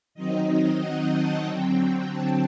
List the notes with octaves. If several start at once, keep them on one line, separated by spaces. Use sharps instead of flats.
D#3 F#3 C4 D#4 D#5
F#5
A5
D3 F#3 C4 G5
A5